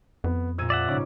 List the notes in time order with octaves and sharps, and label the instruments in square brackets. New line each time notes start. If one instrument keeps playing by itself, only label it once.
[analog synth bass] F2 [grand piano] B3
[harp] A#1 A#2 [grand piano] E6 G#6 D#7
[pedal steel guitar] D5 E5 F#5
[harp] G#2 C#3 [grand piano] C#4 D#4 D6